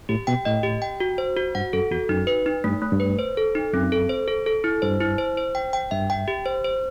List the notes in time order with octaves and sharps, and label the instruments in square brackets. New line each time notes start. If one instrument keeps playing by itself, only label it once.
[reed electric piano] A2 [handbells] G4
[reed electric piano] B2 [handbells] G5
[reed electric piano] A2 [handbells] D#5
[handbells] G4
G5
F#4
C5
F#4
[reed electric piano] G2 [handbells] F#5
[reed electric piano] F#2 [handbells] A4
[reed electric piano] E2 [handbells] F#4
[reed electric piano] F#2 [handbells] D#4
[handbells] B4
D#4
[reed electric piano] G2 [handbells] A3
[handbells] A3
[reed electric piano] G2
[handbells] B4
C5
A4
D#4
[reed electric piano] F#2 [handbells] C4
[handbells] A4
C5
A4
A4
E4
[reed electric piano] G2 [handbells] C5
[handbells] E4
C5
C5
G5
G5
[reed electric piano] G2 [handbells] E5
[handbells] G5
G4
C5
C5